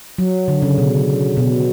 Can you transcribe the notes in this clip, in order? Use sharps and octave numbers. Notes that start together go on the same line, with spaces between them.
F#3
D3
C#3
B2
B2